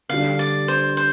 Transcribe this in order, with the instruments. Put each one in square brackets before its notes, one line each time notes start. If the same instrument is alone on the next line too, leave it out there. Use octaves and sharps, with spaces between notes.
[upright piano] D3 G3 D4 [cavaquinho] F5
[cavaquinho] D5
C5
C5